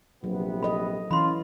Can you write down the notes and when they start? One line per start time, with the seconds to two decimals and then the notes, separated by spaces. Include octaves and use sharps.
0.24 A#1 C3 F#3 B3
0.63 A4 D#5 B5
1.11 E3 C#4 F4 B5 C6